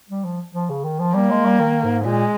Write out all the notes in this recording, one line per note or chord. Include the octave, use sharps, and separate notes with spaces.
G3
F3
F3
C#3
D#3
F3
G3 A#3
G#3
G3
D#3
G#2
A#2 G#3